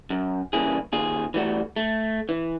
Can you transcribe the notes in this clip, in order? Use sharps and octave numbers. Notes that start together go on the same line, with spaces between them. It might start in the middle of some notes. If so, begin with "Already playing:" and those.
F#2
G2 C#3 E3 A#3 E4 G#4
D#2 F4 G#4
E3 G3 A3 F#4
A3
E3